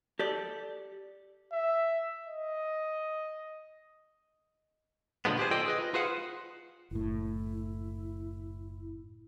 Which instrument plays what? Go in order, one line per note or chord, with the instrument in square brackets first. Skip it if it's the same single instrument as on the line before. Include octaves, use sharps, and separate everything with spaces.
[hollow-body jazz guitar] G4 A4 D5
[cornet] E5
D#5
[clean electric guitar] A#2 D3 F3 G#3 B3
G4 G#4 C5
F4 A4 C5 D5 D#5 G5
G#4 B4 D#5
F4
F4 G#4 B4 C5 F5 F#5
[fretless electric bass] F#1 A2 [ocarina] E4